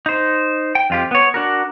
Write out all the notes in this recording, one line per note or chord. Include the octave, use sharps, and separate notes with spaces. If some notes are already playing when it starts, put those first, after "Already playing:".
D#4 C5
G5
F2 F4 G4
B3 C#5
D4 F#4 A#4